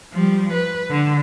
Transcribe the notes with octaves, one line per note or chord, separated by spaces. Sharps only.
F3 G3
B4
D3